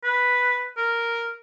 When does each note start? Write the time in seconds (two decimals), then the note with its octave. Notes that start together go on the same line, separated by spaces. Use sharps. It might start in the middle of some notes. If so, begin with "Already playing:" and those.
0.04 B4
0.77 A#4